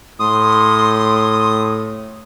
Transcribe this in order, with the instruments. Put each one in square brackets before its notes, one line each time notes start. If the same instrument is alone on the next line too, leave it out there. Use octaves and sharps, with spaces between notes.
[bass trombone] A2 [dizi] C6 [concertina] D#6